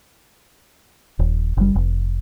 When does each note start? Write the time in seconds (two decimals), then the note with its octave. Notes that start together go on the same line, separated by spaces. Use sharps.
1.19 D#1
1.57 F#1 G3
1.75 F1